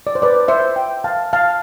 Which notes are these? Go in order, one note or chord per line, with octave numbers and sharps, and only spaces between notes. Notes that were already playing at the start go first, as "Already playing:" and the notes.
D5
C5
B4 D5
C5 E5
E5 G5
F5 A5
F5 A5